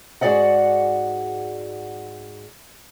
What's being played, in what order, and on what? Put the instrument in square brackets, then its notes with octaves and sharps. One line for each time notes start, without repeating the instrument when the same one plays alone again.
[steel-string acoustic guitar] G#2 F#4 G#4 D5 D#5 F#5